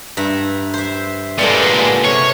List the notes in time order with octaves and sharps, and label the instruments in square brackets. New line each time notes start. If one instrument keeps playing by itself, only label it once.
[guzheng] G2 E5 A#5
C5 E5
[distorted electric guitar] A#2 G#3 [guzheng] G3 B3 A4
[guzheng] C3 [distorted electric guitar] C#5